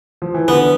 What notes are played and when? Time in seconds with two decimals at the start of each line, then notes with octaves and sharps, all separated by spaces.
0.22 F3
0.34 E3
0.48 D3 B3